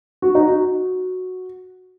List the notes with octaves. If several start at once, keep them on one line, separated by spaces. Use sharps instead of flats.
F#4
D#4
F#4